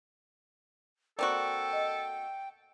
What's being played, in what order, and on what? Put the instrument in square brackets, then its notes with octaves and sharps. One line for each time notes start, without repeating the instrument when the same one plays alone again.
[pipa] A#3 C4 F#4 [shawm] A4 [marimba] D5 [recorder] G5
[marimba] D#5